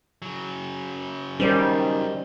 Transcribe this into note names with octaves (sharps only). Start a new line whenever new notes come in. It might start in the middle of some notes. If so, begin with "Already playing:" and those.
C#3 F#3
D#3 G3 C#4 C5 D5